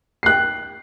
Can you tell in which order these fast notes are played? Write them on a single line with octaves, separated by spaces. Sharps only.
C7 F#6 G5